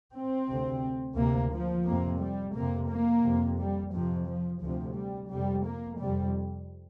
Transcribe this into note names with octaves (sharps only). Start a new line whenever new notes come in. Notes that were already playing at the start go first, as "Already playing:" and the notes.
C4
D2 C3
D2 C3 A#3
F3
F2 C3 A#3
G3
F2 C3 A#3
A#3
F2 C3
G3
F2 C3 F3
F3
D2 C3 F3
G3
F2 C3 G3
A#3
F2 C3 G3